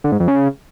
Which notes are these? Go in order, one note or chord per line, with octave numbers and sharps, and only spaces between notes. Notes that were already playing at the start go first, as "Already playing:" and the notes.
D3
G#2
F2
C#3